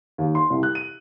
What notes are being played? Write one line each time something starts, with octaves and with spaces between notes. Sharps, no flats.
D#2
C6
C2
F#6
D#7